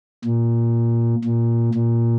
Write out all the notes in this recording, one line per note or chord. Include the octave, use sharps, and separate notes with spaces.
A#2
A#2
A#2